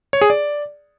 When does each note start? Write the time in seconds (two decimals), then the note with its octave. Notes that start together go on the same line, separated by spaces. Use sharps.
0.13 C#5
0.21 G#4
0.30 D5